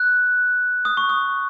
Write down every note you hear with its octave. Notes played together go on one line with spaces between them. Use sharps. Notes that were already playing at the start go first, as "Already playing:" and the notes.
Already playing: F#6
D#6
C#6
D#6